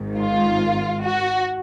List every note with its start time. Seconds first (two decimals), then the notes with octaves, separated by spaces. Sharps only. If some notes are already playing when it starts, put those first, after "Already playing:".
Already playing: G#1 G#2 D#3
0.18 F4
1.04 F#4